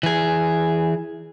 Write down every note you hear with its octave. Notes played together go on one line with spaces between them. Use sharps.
E3 G#4